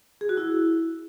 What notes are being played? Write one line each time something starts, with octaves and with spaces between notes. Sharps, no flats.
G#4
F#4
E4